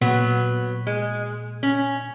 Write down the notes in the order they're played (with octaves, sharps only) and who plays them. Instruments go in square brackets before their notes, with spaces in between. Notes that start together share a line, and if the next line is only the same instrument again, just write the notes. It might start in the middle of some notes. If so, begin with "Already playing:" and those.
[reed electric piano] A#2 [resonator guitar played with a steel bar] F#3 B3
[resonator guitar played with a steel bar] G#3
C#4